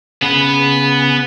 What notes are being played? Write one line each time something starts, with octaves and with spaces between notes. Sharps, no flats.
C#3 B3